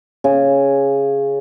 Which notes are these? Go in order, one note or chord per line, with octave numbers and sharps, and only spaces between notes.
C#3